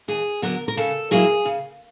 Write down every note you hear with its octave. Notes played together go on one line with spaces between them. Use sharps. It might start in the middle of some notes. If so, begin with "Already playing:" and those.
D#2 G#4
D3 F#3 B3 A#4
A#4
C#3 A4
F#3 A#3 C#4 E4 G#4
C#3